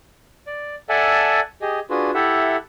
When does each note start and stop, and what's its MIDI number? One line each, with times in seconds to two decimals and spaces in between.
0.47 0.75 74
0.89 1.40 69
0.89 1.40 74
0.89 1.40 76
0.89 1.40 78
0.89 1.40 80
0.89 1.40 81
1.62 1.80 67
1.62 1.80 68
1.62 1.80 75
1.90 2.11 62
1.90 2.11 65
1.90 2.11 66
1.90 2.11 68
1.90 2.11 71
2.14 2.56 64
2.14 2.56 67
2.14 2.56 69
2.14 2.56 76
2.14 2.56 78